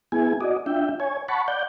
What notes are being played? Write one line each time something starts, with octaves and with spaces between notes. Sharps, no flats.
B3 E4 G#4 G#5
F#4 D5 D#5
D4 F4 E5 G5
C#5 G#5
F#5 A5 B5 C#6
D5 F#5 G6